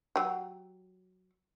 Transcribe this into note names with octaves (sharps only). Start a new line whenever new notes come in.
F#3 G4